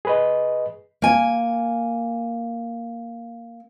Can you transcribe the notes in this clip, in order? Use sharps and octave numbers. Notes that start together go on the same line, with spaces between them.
G#4 B4 D#5
A#3 G#5